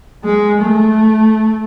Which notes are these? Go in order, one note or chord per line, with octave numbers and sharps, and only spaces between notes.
G#3
A3